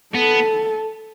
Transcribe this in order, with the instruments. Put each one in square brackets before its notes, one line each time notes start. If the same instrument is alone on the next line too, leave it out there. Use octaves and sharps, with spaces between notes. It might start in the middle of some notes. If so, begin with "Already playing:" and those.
[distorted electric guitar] B3 [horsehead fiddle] A4